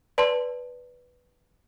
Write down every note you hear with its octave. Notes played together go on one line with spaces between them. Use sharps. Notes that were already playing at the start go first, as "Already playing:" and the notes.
B4 D5 A5 C6